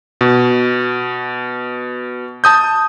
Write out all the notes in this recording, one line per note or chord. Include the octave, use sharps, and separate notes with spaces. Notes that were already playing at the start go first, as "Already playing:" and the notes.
B2
A5 D#6 G6